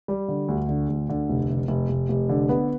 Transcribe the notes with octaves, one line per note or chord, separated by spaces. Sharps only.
G3
D3
D2
D3
D2
D3
F1
F1
F1
F1
F1
D3
B3